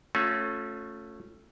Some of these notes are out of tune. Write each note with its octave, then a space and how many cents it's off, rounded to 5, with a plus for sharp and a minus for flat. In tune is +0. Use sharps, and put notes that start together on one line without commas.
A3 +0 C#4 -10 F4 +40